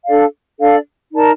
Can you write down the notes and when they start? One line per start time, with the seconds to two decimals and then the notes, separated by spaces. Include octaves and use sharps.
0.05 D4 A4 D5 F5
0.59 D4 A4 D5 F5
1.12 D#4 A#4 D5 A5